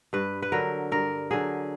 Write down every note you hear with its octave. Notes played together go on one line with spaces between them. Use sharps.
G2 B4
B4
D3 F#3 A#4
G2 A#4
D3 F#3 G#4